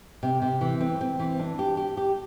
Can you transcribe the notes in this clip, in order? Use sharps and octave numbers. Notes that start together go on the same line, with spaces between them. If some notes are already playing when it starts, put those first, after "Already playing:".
C3
C3
E3
C4
C4
E3
D4
G4
G4
G4